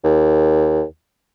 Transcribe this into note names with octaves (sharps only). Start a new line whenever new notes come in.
D#2